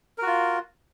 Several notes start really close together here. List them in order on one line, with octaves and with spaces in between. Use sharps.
A#4 F#4 F4